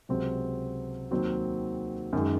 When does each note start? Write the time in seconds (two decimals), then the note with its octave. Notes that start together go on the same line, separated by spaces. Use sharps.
0.09 C#2 C3 F#3 C4
1.11 D#2 D#3 F#3 C4 F#4
2.13 F#2 D#3 G#3